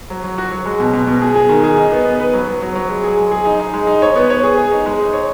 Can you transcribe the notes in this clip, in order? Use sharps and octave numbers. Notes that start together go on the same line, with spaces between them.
F#3
F#3
F#4
F#3
G#3
B2
B2
B2
G#4
G#4
D#3
G#4
D#4
B3
B3
B4
F#3
F#3
F#3
F#3
G#3
G#4
G#3
G#4
D#4
D#4
G#3
D#4
C#5
B3
C#5
G#4
G#4
D#4
G#3
D#4
C#5